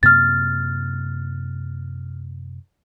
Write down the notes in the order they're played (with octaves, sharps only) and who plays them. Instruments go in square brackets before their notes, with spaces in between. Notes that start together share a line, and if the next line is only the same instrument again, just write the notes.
[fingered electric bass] F#2 C3 A#3 [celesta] F6 A6